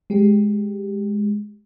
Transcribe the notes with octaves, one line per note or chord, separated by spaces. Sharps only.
G#3 G4